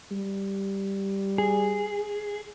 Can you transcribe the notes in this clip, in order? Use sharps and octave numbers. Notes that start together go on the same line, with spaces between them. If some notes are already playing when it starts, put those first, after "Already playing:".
G3
G#4